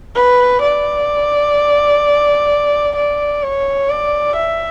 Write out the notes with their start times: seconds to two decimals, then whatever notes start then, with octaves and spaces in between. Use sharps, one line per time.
0.15 B4
0.62 D5
2.96 D5
3.43 C#5
3.89 D5
4.36 E5